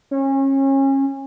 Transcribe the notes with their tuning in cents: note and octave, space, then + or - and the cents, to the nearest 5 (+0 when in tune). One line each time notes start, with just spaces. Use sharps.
C#4 -30